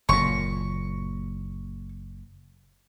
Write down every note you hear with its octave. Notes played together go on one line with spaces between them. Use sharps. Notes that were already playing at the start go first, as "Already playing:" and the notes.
F#1 A#2 C#6